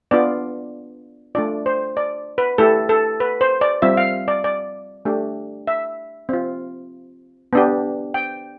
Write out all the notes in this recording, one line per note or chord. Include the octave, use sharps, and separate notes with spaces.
B3 D4 F4 D5
A3 D4 F4 D5
C5
D5
B4
A3 E4 G4 A4
A4
B4
C5
D5
G3 C4 F4 E5
F5
D5
D5
A3 D4 G4
E5
C4 F4
B3 D4 G4
G5